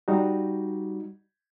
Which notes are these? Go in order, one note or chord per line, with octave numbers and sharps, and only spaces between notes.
G3 D#4 F#4